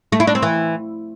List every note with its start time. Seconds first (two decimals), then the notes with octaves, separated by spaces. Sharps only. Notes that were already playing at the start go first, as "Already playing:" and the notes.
0.12 A3
0.20 E4
0.27 D4
0.35 C4
0.42 E3